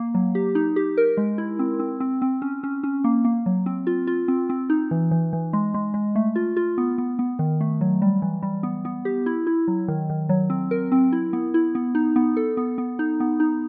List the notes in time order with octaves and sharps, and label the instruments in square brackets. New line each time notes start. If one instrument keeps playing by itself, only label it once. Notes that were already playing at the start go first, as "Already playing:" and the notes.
Already playing: [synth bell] A#3
F#3
G4
D#4
G4
A#4
G#3
E4
C4
C4
C4
C4
C#4
C#4
C#4
A#3
A#3
F#3
C4
F4
F4
C4
C4
D#4
E3
E3
E3
G#3
G#3
G#3
A3
F4
F4
B3
B3
B3
D#3
A3
F#3
G3
E3
G3
B3
B3
G4
E4
E4
F#3
D#3
D#3
F#3
C4
A#4
C4
E4
B3
E4
B3
D#4
B3
A4
B3
B3
D#4
B3
D#4